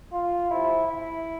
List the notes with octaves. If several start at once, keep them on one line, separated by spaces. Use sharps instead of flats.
F4
C3 F3 E4
E4